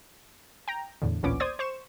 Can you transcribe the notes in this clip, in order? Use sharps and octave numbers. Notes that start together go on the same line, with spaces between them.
G5 A#5
E2 A2 D3
A1 D2 A#2 B3 C#4 D6
C5 D5 D#6 G#6
C5 C#6 E7